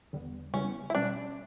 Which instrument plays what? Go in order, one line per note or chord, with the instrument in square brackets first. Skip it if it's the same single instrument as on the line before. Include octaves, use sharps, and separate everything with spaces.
[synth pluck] E2 D3 G3 B3
[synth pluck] C#3 G3 B3 E4 [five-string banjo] C#4
[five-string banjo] E4
[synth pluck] B2 G3 C#4 [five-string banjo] D4